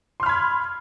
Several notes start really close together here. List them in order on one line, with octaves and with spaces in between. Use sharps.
C6 F6 B5 G#6